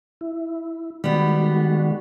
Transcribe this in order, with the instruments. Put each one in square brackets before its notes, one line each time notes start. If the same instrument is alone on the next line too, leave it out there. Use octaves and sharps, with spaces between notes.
[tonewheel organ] E4
[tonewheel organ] D#3 G#3 F#4 [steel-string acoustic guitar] G3 B3